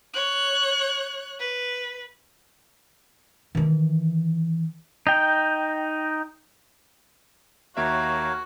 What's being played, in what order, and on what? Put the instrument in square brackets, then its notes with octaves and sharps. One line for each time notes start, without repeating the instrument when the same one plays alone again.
[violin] C#5 F#6
B4
[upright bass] D#3 E3
[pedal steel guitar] D#4 G5
[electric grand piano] D#2 A#3 E5 [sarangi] F#4 [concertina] A#4 C#5 F5